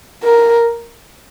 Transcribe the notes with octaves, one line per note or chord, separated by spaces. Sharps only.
A#4